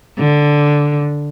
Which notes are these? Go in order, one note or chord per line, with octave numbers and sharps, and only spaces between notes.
D3